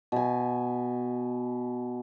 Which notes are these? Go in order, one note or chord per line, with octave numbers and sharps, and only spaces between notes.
B2 G#5